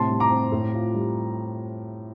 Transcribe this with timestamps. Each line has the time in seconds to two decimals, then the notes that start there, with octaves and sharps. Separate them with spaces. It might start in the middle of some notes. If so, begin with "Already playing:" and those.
Already playing: A2 C3 A5 C6
0.09 G3
0.20 A#5 D6
0.30 C4
0.52 A2
0.74 F4
0.94 G3